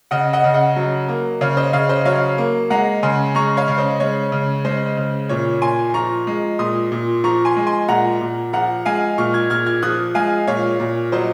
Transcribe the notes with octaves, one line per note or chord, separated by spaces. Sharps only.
C#3 D#5 F#5
D#5 F#5
C#3
D#5 F#5
F#3
A#3
C#3 C#5 F5
C5 D#5
C#3 C#5 F5
C5 D#5
F#3 C#5 F5
A#3
G#3 F#5 A#5
C#3 G#5 C6
G#3 A#5 C#6
C#5 F5
C#3
C5 D#5
G#3 C#5
C#3
G#3 C5
C#3
A#2 C#5
A#2 G#5 C6
F3 A#5 C#6
G#3
A#2 C6 D#6
A#2
F3 A#5 C#6
G#5 C6
G#3
G#5 C6
A#2 F#5 A#5
A#2
F3 F#5 A#5
G#3 F5 G#5
A#2 C#6 F6
F6 G#6
A#2 F6 G#6
F6 G#6
F3 D#6 F#6
G#3 F5 G#5
A#2 C#5 F5
A#2
F#3 C5 D#5